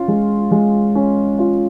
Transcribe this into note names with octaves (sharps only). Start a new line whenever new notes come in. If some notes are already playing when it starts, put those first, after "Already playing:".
Already playing: C#4 F4
G#3
G#3
C#4
F4